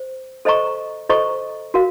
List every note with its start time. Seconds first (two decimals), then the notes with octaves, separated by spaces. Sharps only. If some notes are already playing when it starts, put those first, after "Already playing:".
Already playing: C5
0.45 A4 C5 D#5 A#5 C#6
1.09 A4 C5 D#5 A#5 C#6
1.74 F#4 A#4 F5